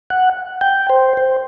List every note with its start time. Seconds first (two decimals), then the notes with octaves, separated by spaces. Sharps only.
0.10 F#5
0.61 G5
0.89 C5
1.17 C5